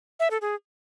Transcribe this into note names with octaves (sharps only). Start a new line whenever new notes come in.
E5
A4
G#4